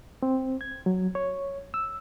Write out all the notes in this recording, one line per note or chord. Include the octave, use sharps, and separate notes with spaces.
C4
G#6
F#3
C#5
E6